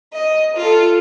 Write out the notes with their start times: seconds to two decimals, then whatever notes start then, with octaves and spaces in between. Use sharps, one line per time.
0.14 D#5
0.57 F4 A4